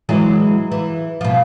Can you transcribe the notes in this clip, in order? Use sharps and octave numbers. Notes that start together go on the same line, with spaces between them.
E3 F#3 G#3
E3
B2 F3